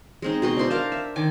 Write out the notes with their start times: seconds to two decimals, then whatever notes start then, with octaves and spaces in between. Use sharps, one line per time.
0.22 G#3 C4 D#4
0.42 B2 B4 C6
0.56 D4 E4 C5 C6
0.70 A#4 F5 A5
0.92 E5
1.16 D#3 G#5 D6